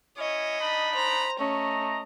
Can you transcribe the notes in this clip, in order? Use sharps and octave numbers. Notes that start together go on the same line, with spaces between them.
C#4 E4 C#5 D#5
D4 D#4 B5
C5 A#5
A3 C#4 D#5 A#5